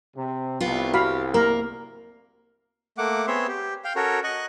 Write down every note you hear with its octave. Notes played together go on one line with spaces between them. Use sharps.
C3
C2 B3 F4
F#4 G4 F5 B5
A#3 A#4
A3 A#3 F#5 D6
B3 C4 G#4 C#5 E5 C6
G4
F5 G5
C#4 F#4 A4 A#4 C#5
D#5 C#6 F#6